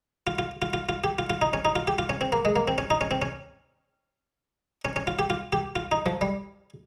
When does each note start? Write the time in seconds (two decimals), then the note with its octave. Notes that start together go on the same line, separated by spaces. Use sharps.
0.27 F4
0.39 F4
0.62 F4
0.73 F4
0.89 F4
1.04 G4
1.19 F4
1.30 F4
1.42 D#4
1.53 C#4
1.65 D#4
1.76 F4
1.87 G4
1.98 F4
2.09 C#4
2.21 C4
2.32 A#3
2.45 G#3
2.56 A#3
2.68 C4
2.78 C#4
2.90 D#4
3.01 C#4
3.11 C4
3.22 C#4
4.85 C#4
4.96 C#4
5.07 F4
5.19 G4
5.30 F4
5.53 G4
5.76 F4
5.92 D#4
6.06 F3
6.21 G3